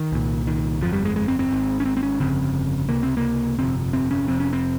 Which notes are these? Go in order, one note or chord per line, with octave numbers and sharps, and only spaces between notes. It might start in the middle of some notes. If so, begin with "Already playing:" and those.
Already playing: D#3
C2 A#2
D#3
G1 F2 C3 F3
G3
G#3
G#3
C4
C4
G#1 G#2
C#4
C4
C4
C#4
G1 F2 C#3 C4
C#2 C3 A#3
C4
A#3
G1 F2 C3 C4
C4
C#4
F1 F2 C3 C4
C#4
C4